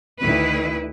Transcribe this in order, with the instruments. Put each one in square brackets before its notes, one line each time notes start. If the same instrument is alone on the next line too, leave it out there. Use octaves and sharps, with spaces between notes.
[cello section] D2 D#3 E4 B4